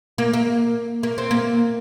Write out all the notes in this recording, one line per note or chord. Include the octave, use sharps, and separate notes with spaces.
A#3
A#3
A#3
C4
A#3